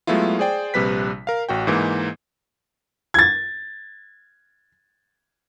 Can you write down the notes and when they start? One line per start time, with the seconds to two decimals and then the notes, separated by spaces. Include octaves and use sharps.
0.07 F#3 G#3 A3 B3 E4 F4
0.39 G#4 C5 D5 G5
0.74 A#1 C3 G3 B4 B6
1.27 A#4 F5
1.49 A1 F#4 G5
1.67 G#2 E3 A#3
3.14 G#6 A6